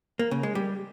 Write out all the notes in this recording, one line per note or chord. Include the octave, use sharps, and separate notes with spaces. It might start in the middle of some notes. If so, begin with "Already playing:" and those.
A#3
C#3
G#3
G3